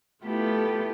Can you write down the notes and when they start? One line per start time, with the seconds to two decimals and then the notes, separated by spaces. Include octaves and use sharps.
0.24 A3 B3 E4 F4 G4 A4